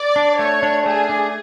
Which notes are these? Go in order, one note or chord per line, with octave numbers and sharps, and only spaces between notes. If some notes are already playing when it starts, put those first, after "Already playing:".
Already playing: D5
D4
A3 C#5
D4
A3 G#4
D4